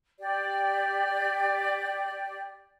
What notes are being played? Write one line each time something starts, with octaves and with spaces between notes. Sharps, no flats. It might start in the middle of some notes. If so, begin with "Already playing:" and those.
G4 D5